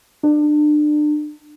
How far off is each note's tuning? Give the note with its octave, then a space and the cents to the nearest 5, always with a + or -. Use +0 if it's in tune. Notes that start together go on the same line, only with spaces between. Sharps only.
D4 +30